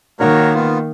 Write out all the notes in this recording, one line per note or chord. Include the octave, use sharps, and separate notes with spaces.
D#3 A#3 F#4 A#4 C#5
B3 F4